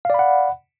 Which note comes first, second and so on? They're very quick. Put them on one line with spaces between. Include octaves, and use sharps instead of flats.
F5 D5 B5 F#5